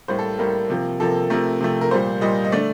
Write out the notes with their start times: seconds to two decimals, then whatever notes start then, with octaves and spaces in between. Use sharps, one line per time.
0.08 A2 G3 A#3 C5
0.18 A4
0.38 A2 G3 A#3 A#4
0.70 C3 F3 A#3
1.00 C3 F3 A#3 A4
1.30 C3 F3 A3 A#4
1.61 C3 F3 A3
1.81 A#4
1.91 A#2 G3 A#3 C5
2.21 A#2 G3 A#3 D#5
2.45 D#5
2.52 D3 A3 D5